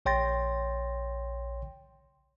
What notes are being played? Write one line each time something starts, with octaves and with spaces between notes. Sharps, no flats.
A#1 C#5 G5 C6 A6 A#6